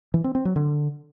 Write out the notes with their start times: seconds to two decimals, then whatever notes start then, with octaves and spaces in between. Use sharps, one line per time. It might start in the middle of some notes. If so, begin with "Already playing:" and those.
0.14 E3
0.24 C4
0.35 C4
0.45 F#3
0.56 D3